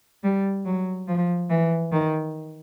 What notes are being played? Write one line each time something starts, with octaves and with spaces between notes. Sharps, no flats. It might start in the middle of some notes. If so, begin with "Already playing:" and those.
G3
F#3
F3
E3
D#3